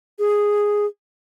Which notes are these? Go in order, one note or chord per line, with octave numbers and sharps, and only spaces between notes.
G#4